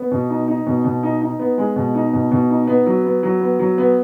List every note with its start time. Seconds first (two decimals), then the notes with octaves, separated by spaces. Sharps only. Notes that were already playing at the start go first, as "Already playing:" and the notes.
Already playing: B3
0.12 B2
0.30 D#4
0.48 D#4
0.67 B2
0.85 B2
1.03 D#4
1.22 D#4
1.39 B3
1.58 G#3
1.76 B2
1.95 D#4
2.13 B2
2.31 B2
2.50 D#4
2.67 B3
2.86 F#3
3.04 B3
3.23 F#3
3.41 B3
3.59 F#3
3.78 B3